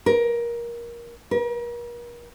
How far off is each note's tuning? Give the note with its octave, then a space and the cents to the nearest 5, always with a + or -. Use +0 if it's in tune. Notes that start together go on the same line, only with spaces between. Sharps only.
A#4 +20
A#4 +40